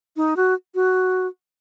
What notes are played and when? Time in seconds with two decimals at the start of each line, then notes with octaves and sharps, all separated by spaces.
0.17 D#4
0.37 F#4
0.75 F#4